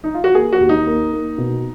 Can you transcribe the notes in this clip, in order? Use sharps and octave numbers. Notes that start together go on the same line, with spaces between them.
D#4
F4
F#4
A#3 G#4
F#4
D#2
D#4
A#3
A#3
B2